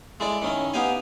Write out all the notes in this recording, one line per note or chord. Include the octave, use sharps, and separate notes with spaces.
G#3 E4 A4 D5
D#3 C#4 E4
B3 D#4 G4 F5 G#5